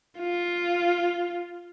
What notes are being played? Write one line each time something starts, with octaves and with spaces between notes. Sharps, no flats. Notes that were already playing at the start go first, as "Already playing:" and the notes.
F4